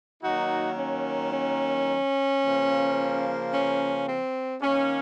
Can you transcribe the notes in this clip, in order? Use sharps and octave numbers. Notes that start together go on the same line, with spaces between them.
D#3 F#3 A#3 D#4 F#4
C#4
C#4
C#3 F3 A#3
C#4
C4
D#3 A#3 C#4